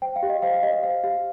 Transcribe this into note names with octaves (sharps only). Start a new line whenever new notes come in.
C5 G5
F5
G4
D#5
C5 F5
F5
G4 D#5
D#5
C5 F5
G4 F5